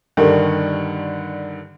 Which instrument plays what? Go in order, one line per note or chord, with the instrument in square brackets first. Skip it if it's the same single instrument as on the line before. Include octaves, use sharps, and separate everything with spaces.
[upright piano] G2 D3 D#3